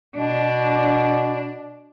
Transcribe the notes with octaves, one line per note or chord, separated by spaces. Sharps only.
B2 D4